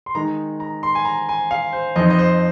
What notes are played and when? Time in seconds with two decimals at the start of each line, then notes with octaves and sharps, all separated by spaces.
0.06 C6
0.15 D#3 G#3 D#4 A#5
0.60 A#5
0.83 C6
0.95 G#5
1.05 A#5
1.29 G#5
1.51 F5
1.73 C5
1.96 F2 F3 C4 D#4 D#5
2.10 D#5
2.19 C5